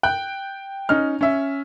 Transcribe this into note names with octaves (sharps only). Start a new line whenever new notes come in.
G5 F#6
C#4 D#4 F6
C#4 E5